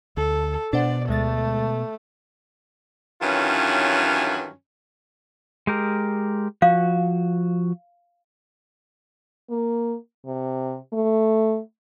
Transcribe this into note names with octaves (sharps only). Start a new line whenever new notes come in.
D2 A4
B2 D4 C5 D5 F#5
D2 G#3 A3 A6
G2 D#3 E3 F#3 C#4 F4
G#3 G4 A#4
F3 F#4 F5
A#3
C3
A3